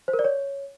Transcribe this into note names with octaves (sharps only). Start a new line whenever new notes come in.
C5
A#4
D5
C#5